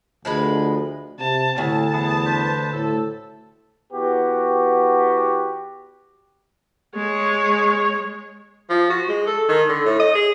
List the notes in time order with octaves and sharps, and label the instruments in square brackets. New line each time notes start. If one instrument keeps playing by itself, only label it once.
[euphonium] D2 [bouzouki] F3 G#3 B4
[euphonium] C3 [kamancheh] A5
[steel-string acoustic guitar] D2 [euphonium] A2 [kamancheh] A5
[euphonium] E2 [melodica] E4 G#4 F#5
[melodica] D4 B4 C5
[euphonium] A2 [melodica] A4 E6
[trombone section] E2 B3 F#4 G4
[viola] G#3 C#5
[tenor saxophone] F3
F#4
G#3
A4
D#3
D3
A2
D#5
G#4